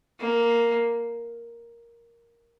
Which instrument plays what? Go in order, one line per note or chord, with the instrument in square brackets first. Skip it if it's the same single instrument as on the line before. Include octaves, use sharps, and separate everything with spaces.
[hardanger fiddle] A#3